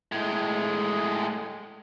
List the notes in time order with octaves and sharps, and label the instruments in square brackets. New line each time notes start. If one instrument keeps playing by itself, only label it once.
[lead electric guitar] A2 G#3